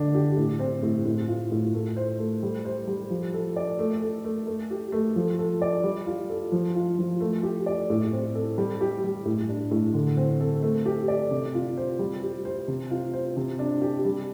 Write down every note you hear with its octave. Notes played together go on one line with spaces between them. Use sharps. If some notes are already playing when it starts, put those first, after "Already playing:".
Already playing: D3 D4
G4
A2
C4
A2
A2
F4
A2
A3
C5
A3
G3
C5
G3
F3
A4
D5
A3
A4
A3
A3
G4
A3
F3
A4
D5
G3
F4
A4
F3
F4
F3
A3
G4
D5
A2
C4
A4
G3
G4
G3
A2
D4
A2
D3
C4
A4
A3
G4
D5
C3
F4
C5
G3
G4
C5
C3
F4
C5
C3
D4
G4
G3